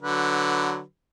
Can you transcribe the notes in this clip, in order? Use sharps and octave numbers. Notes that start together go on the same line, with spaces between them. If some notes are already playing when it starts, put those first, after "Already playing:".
D3 F#3 B4